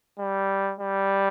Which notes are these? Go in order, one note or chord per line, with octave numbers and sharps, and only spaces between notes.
G3
G3